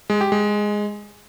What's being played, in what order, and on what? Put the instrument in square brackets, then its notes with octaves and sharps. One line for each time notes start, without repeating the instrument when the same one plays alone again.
[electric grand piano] G#3
G4
G#3